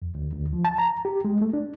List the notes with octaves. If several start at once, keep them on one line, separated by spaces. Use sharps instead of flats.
F2
D2
D2
F3
A5
A#5
G4
G#3
A3
D4